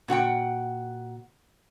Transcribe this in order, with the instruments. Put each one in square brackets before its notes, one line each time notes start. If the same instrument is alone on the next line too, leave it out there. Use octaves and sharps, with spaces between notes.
[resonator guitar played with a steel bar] A#2 F#4 F#5 G5